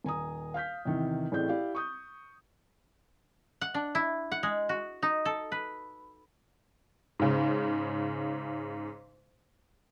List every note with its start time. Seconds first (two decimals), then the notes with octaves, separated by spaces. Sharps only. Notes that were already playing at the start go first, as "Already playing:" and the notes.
0.04 D#1 G#5 A#5 D#6
0.54 F5 F6 G6 B6
0.85 E2 C3 D#3 E3
1.32 A1 A2 C4 G#4 D5 G6
1.49 E4 G4 D5 F5
1.75 C#6 D#6 G6
3.61 F#5
3.74 D4
3.95 E4
4.32 F#5
4.43 G#3
4.69 F#4
5.03 D#4
5.25 A4
5.52 B4
7.19 G#2 C#3